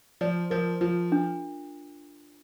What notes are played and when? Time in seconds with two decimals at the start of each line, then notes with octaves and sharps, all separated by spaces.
0.21 F3 D5
0.50 F3 A#4
0.81 F3 F4
1.12 D4